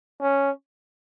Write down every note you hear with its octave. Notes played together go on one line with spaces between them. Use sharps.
C#4